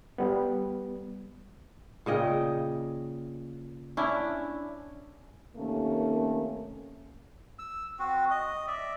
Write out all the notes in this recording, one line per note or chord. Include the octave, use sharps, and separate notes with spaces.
G3 B3
A#2 C#3 D#5 G5
C#4 D4 E4
C3 D#3 A3 A#3 C#4
E6
C4 F#4
D#5
D5 E5